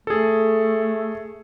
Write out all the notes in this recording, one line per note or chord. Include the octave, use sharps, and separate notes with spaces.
A3 G#4 A4